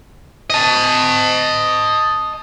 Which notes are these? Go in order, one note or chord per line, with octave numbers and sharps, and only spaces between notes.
D#5 A5